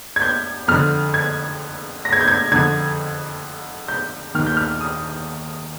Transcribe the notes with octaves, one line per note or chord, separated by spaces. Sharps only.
G#6
G6
F2 D3 F6
G#6
A#6
G#6
G6
G#6
F2 D3 G#6
G6
D#2 D#3 F6
G6
F6
D#6